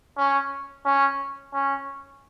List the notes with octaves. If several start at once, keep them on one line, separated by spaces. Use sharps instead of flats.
C#4
C#4
C#4